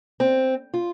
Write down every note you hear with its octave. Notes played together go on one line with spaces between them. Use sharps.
C4
F4